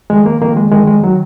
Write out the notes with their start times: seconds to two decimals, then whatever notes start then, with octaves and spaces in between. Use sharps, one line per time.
0.10 F2 D#3 G#3
0.26 A#3
0.41 F2 D#3 A#3
0.57 G#3
0.71 F2 D#3 G#3
0.88 G#3
1.03 D#3 F#3